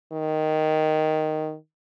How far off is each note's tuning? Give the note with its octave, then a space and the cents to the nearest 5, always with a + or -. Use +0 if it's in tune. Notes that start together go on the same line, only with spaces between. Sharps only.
D#3 +0